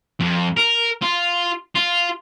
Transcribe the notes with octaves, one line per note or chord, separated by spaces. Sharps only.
F2
A#4
F4
F4